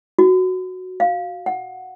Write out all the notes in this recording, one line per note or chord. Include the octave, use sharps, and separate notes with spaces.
F#4
F5
F#5